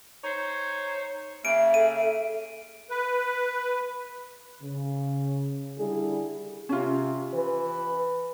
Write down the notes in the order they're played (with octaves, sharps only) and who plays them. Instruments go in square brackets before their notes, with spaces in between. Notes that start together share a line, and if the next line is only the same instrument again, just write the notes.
[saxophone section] D#4 C5 C#5
[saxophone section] C#3 A#3 [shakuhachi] E5 [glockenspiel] D7
[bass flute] A4 [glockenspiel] D#7
[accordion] B4
[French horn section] C#3
D3 G3 E4 G#4
[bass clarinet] C3 [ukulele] C#4 F4
[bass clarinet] E3 [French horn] B4